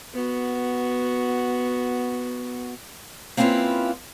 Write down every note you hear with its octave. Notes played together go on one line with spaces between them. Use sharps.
B3 F#4
A#3 C4 C#4 E4 F4 B4